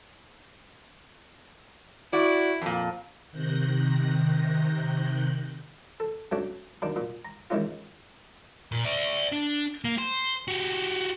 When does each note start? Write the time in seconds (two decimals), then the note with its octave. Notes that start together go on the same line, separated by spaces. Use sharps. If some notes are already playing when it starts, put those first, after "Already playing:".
2.13 E4 F#4 D5
2.61 F2 A#2
3.31 C3 D#3 F#6 G6 A#6
6.00 A4
6.32 F#3 A3 C#4 D4 F#4
6.82 F#2 D#3 D4
6.96 A#2
7.25 A#5
7.50 D#3 E3 G#3 C#4 F4
8.72 A#2
8.85 D5 E5
9.32 D4
9.84 A#3
9.98 C5
10.48 F#4 G4